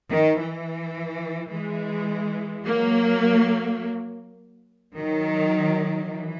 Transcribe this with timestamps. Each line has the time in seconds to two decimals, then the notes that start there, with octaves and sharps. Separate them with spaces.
0.10 D#3
0.39 E3
1.52 E3 G#3
2.66 F#3 A#3
4.95 D#3 F#3
6.08 E3